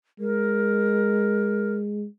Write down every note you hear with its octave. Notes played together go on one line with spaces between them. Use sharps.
G#3 A#4